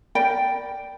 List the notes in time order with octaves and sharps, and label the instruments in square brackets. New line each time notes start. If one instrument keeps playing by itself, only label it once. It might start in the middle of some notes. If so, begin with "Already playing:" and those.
[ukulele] A#4 D5 G5 B5